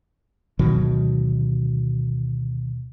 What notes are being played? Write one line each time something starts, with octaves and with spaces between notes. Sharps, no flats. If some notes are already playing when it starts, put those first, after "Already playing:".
D2 B2 D#3 F#3